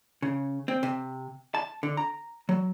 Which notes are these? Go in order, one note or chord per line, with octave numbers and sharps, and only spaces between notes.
C#3
C4
C3
A5
D3
A#5
F#3